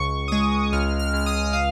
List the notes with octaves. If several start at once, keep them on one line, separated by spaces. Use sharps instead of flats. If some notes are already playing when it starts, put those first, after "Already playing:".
Already playing: C#2 C#6
D#6
G#3 C#6
C#2 F6
F6
C#2 F6
D#6
F5